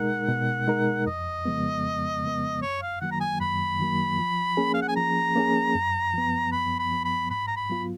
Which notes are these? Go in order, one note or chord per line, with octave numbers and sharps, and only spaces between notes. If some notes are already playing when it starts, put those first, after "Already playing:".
Already playing: B2 G#3 D#4 A#4 F#5
B2
G#3 D#4 A#4
F2 D#5
C#3 F3 G#3 B3
F2
C#3 F3 G#3 B3
F#2 C#5
F5
D#3 F#3 A#3 F#5
A#5
G#5
F#2 B5
D#3 F#3 A#3
F3
A#3 C#4 G#4
F5
F#5
G#5
F3 A#5
A#3 C#4 G#4
F#2
F3 B3
F#2 B5
B5
F3 B3
B5
G#2 B5
A#5
B5
F#3 B3 F4